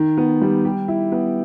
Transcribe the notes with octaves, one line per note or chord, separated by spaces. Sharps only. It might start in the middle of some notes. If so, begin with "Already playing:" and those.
Already playing: D#3
B3
G3
G4
E4
B3